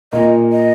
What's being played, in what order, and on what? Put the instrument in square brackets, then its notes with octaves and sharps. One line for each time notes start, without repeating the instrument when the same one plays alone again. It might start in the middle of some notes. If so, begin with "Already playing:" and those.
[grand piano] A#2 A#3 [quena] D#5
[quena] D#5